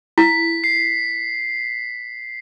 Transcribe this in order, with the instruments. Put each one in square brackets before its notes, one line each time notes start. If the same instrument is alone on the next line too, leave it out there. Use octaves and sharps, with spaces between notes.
[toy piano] E4 [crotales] B6
[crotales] C7